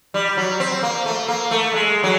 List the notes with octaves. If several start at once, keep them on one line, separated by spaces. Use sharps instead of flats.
G3
F#3
C4
A#3
A3
A#3
A3
G#3
F#3